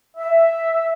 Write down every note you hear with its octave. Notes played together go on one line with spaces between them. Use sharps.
E5